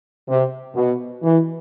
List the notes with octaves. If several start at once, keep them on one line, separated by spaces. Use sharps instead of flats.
C3
B2
E3